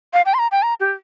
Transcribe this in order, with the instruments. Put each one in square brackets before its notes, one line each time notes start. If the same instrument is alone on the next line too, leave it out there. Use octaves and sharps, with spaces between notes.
[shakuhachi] F5
G5
C6
A#5
G5
A#5
G4